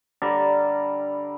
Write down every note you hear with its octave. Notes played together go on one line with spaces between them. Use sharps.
D3 G3 D5 A#5